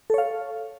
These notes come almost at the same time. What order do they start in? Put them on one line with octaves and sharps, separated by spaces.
A4 C#5 F5